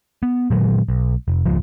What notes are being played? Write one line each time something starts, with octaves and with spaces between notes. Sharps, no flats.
B3
A#2 D#3 F#3 G#3
B1
F1
G#1 C#2 F3